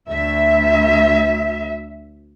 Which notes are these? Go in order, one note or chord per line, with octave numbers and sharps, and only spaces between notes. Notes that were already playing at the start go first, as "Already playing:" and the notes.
D2 E5